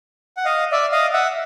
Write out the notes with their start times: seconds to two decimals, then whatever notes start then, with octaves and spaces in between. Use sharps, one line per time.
0.37 F#5
0.45 D#5 F5
0.72 D5 E5
0.92 D#5 F5
1.13 E5 F#5